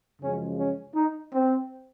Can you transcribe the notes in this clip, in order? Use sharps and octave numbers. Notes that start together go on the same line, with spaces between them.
F#2 C#3 F3 G#3 C#4
C#4
D#4
C4